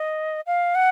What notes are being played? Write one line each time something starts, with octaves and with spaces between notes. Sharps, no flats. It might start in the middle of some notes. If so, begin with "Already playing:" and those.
Already playing: D#5
F5
F#5